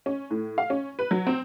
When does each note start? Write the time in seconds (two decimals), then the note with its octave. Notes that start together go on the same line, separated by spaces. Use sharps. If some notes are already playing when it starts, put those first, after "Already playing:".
0.06 C#4
0.31 A2
0.58 F5
0.70 C#4
0.99 B4
1.11 F#3
1.27 C4